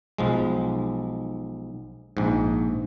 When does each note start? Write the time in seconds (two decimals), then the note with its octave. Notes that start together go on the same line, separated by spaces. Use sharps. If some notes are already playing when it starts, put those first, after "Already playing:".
0.18 B1 F3 G#3
2.17 A#1 G#2